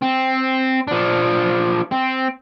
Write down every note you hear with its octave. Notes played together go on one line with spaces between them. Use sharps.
C4
F3 D4
C4